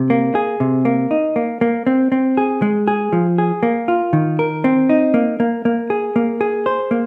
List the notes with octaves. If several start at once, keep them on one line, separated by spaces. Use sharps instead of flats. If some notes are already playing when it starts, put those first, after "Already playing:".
Already playing: C3
A#3
G#4
C3
A#3
D#4
A#3
A#3
C4
C4
G#4
G#3
G#4
F3
G#4
A#3
F4
D#3
A#4
C4
D#4
A#3
A#3
A#3
G#4
A#3
G#4
C5
A#3